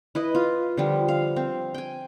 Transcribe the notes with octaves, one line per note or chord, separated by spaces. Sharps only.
E4 B4 D#5
F4
D3 F3 G3
F5
C4
G5 G#5